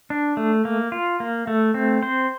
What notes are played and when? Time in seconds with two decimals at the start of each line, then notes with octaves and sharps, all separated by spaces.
0.10 D4
0.37 A3
0.65 A#3
0.92 F4
1.20 A#3
1.47 A3
1.74 C4
2.03 C5